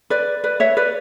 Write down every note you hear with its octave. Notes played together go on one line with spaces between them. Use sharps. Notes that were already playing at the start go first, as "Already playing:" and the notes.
B4 D5
B4 D5
C#5 E5
B4 D5